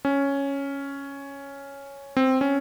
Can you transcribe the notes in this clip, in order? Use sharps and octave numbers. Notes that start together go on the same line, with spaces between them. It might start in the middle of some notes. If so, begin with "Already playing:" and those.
C#4
C4
C#4